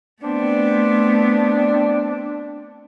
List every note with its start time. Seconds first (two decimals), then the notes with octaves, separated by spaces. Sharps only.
0.22 A3 B3 C4 D4